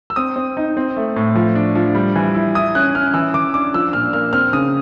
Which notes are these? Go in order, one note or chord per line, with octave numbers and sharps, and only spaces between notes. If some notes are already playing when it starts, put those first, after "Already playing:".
E6
C4 D#6
C4
D#4
C4
A3
A2
F3
D4
F3
G3
E3
E4
E4 D#6
C#4 F#6
C#4 F6
E3 E6
E3 D6
D4 D6
F3 E6
A#2 F6
A#3 F6
C4 F6
C#3 D#6